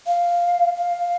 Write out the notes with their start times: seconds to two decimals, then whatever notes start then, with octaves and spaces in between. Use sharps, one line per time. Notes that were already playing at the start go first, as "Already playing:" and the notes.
0.07 F5
0.76 F5